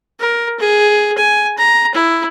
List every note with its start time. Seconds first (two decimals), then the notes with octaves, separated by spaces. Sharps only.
0.19 A#4
0.59 G#4
1.18 G#5
1.58 A#5
1.94 E4